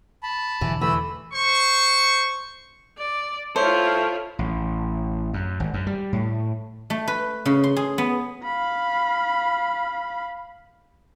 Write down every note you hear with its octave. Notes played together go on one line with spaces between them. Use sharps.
A5 B5
E2 B2 D3 E3
E3 A3 B5 E6
C5 C#6
D5
E4 F4 A4 C5 C#5
A1
F#2
G#1
F#2
G3
A2
A3
B4
C#3
C6
G#4
B3
F5 B5